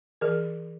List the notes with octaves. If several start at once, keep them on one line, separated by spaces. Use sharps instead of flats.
E3 G#4 A#4